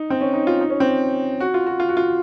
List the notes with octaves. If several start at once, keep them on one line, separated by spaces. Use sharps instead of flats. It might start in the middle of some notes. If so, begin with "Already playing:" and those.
Already playing: D#4
C4
C#4
D#4
F4
D#4
C#4
C4
F#4
F4
F#4
F4
F#4
F4